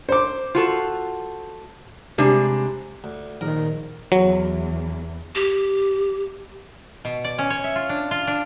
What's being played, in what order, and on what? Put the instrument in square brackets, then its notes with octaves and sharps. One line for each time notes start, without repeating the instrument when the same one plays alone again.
[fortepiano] C5 D6
[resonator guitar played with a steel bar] F4 F#4 A4
[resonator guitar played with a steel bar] C3 G#3 D4 [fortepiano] G3
[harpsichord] D2
[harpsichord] A#1 A#4 [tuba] D#3
[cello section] E2 [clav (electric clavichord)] F#3
[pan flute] G4
[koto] B2
D5
C#4
C#5
E5
F4
D4
F4
D4